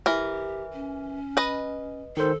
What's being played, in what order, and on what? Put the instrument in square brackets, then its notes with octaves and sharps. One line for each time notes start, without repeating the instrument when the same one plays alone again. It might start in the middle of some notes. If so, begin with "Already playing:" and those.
[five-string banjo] E3 A#4 [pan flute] G4
[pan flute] C#4
[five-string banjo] B4 D#5
[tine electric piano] D#3 C5 [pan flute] A4